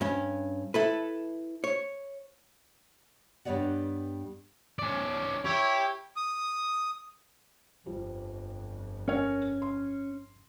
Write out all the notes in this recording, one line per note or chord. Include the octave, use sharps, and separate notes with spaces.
G2 C#4
E4 A4 B4
C#5
G2 G3 B3 C#5 D5 F#5
C#4 D5
E4 G4 C#5
D#6
G1 F2 F3 G3
C#4 A#4 C#5 G#5
C6